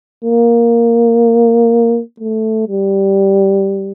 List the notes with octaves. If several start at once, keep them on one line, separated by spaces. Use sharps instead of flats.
A#3
A3
G3